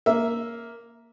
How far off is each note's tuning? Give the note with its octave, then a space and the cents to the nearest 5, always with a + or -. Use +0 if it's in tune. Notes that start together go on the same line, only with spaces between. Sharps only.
A#3 +0 E5 +0